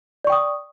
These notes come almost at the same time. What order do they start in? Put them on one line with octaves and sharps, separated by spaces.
D5 C#6 G5 D#6